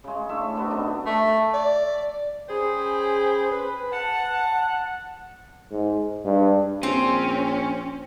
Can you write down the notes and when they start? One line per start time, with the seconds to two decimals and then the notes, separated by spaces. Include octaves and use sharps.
0.04 C#3 G#3
0.29 A2 D4 E5 C#6
0.55 C3 B3 D4
0.70 F#2 D3 D4 D#4
1.06 A3
1.54 D5
2.49 C#4 G#4 C5 G5 B5
3.52 B4
3.92 F#5 A5
5.71 G#2
6.24 G2
6.83 A#1 C4 C#4